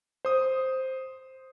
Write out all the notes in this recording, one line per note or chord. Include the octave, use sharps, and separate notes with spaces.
C5 D#6